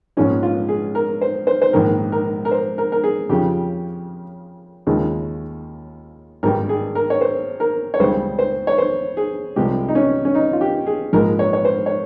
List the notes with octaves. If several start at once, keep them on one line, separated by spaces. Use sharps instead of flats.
A#1 G#2 F3 G#3 C#4
F4
G#4
A#4
C5
C5
C5
A#1 G#2 D#3 A#4
A#4
A#4
C5
A#4
A#4
G#4
F2 C#3 F3 G4
D#2 C#3 F3 G#3
G#1 G2 D#3 G3 A#4
G#4
A#4
C#5
C5
A#4
C#5
C#2 C#3 G3 C5
C5
C#5
C5
G#4
C2 C3 F3 G#3 G4
D#4
C#4
C#4
D#4
F4
G4
G#4
A#1 G#2 F3 G#3 A#4
C#5
C#5
C5
C#5